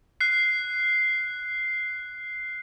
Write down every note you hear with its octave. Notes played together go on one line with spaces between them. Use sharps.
F#6 C7